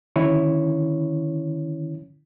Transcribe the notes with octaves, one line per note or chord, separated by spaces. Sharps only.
D3 D#3 C#4 E4 C#5